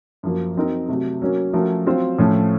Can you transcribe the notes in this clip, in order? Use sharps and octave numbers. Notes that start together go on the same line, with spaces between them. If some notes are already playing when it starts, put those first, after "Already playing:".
F#2 F3 A#3
F#3 C4 D#4 A#4
C3 F#3 A3
F#3 A#3 C#4
F3 A3 C#4 F#4 A#4
F#3 C4 F4 C5
A2 F3 A3 C#4